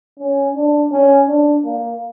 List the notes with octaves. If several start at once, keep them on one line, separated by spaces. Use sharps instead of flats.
C#4
D4
C#4
D4
A#3